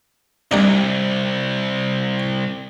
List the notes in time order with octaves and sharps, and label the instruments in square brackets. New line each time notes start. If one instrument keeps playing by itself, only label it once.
[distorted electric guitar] C2 [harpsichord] G3 D4 D#4